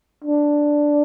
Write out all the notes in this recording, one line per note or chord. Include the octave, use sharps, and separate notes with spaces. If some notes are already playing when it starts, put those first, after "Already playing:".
D4